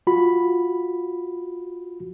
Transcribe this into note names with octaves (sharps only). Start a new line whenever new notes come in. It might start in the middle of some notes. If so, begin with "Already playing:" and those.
F4 F#4 B5